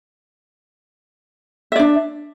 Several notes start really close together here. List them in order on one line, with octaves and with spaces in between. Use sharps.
E5 D5 D4